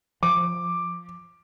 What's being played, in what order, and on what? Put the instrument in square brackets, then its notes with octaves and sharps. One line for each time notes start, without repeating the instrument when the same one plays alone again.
[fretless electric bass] F3 [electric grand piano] D6